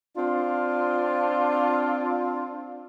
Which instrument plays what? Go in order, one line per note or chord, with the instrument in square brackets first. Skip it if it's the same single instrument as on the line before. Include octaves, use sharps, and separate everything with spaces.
[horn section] C4 D4 F4